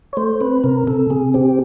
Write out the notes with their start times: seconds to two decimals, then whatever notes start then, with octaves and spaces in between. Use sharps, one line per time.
0.13 C#5
0.17 A3 C5
0.41 C4 B4
0.64 C3 A#4
0.87 C3 A4
1.10 C3 G#4
1.34 C4 G4